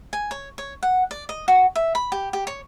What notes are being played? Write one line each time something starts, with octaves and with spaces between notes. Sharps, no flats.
G#5
C#5
C#5
F#5
D5
D#5
F#4
E5
B5
G4
G4
C#5